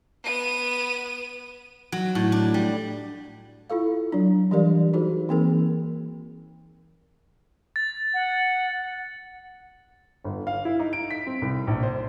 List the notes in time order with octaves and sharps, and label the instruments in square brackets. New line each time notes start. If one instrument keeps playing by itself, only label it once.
[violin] B3 D#7
[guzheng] F#3
A2
D4
G3
[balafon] E4 F4 A4 F5
F#3 D4
E3 G3 G4 A#4 D5 F5
D#4 F#4 G#4 A#4 C5
E3 A#3 C4 D#4 G#4 A#4
[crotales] A6
[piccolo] F#5
[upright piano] G1
F5
E4
D#4
D7
B6
C4
C2
A#1
C5